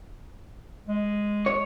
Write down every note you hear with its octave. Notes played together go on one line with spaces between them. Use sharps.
G#3
C#5